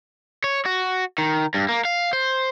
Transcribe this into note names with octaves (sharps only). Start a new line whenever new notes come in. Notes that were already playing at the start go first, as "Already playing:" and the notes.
C#5
F#4
D#3
G2
A#3
F5
C5